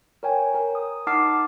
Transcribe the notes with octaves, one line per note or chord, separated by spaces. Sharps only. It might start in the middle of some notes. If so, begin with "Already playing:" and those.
A#4 C#5 G5 G#5
A#4
D#6
D#4 F#5 A5 D6 F6 C7